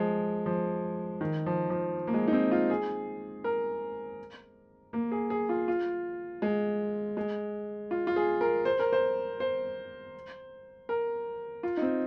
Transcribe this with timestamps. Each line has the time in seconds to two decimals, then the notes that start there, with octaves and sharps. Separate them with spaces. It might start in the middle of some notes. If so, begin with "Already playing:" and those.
Already playing: F3 G#3
0.46 F3
1.21 D#3
1.46 F3
1.70 F3
2.07 A#3
2.14 G#3
2.28 D#4
2.33 C4
2.51 F4
2.70 G#4
3.44 A#4
4.93 A#3
5.12 G#4
5.30 G#4
5.49 F4
5.68 F4
6.42 G#3
7.17 G#3
7.91 F4
8.07 F4
8.16 G#4
8.41 A#4
8.65 C5
8.79 A#4
8.93 C5
9.40 C5
10.89 A#4
11.63 F4
11.77 D#4
11.82 C4